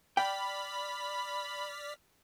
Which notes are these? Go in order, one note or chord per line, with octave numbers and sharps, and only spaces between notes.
D5 G5 B5 F6 B6